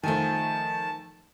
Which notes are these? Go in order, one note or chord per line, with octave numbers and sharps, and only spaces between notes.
D#3 F3 A3 G#5 A5